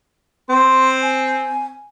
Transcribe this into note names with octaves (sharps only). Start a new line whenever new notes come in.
C4 C6
G#5